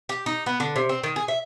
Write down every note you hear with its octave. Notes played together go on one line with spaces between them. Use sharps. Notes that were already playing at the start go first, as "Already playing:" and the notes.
G4
D#4
B3
D3
C3
C4
D#3
G#4
E5